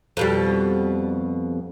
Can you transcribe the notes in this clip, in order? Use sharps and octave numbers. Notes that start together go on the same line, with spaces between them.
F2 B2 G3